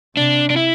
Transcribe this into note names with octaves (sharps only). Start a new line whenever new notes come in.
C3 D4
D4
E4